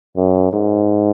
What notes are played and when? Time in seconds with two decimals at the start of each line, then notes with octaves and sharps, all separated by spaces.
0.17 F#2
0.53 G#2